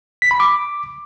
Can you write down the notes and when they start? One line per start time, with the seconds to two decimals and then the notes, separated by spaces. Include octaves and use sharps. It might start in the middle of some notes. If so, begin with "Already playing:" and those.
0.22 B6
0.31 B5
0.40 D6